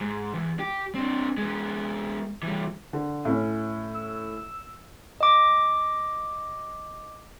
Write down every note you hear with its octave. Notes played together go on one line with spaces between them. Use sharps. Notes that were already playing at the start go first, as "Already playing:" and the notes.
G#2
E2
G4
C4 D4
G#3 B3
E3 G3
D3
A2 C#4
E6
D#5 D6